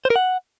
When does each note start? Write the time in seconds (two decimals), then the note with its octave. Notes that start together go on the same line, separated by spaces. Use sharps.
0.05 C5
0.10 A#4
0.16 F#5